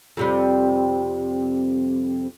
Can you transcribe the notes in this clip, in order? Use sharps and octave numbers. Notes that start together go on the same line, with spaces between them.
F2 C3 G3